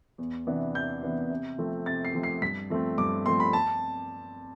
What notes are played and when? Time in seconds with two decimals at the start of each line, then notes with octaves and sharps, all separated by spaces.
0.18 E2
0.47 C3 E3 B3 D4
0.75 E2 G6
1.02 C3 E3 B3 D4
1.30 C3
1.58 F3 A3 C4
1.86 C3 A6
2.05 C7
2.14 F3 A3 C4
2.23 C7
2.42 G2 B6
2.70 F3 A3 C4
2.98 G2 D6
3.26 F3 A3 C4 C6
3.40 B5
3.53 A5